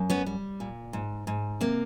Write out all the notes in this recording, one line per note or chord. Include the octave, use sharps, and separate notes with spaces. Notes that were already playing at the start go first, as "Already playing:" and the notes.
Already playing: F#2
B3 C#4
G3
A#2
G#2
G#2
C3 A#3